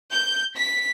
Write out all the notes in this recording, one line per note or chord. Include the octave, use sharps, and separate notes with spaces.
G6
B6